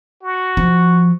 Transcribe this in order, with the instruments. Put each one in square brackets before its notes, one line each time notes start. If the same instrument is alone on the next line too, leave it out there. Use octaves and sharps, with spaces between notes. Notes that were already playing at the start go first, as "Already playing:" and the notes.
[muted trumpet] F#4
[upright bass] F3